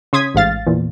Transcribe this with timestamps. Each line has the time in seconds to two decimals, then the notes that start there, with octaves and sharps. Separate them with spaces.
0.13 C#3 C6 D#6 G#6 B6
0.34 A1 G#2 F5 A6
0.66 E2 A#2